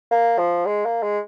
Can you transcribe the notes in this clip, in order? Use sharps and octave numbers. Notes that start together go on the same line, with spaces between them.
A#3
F3
G#3
A#3
G#3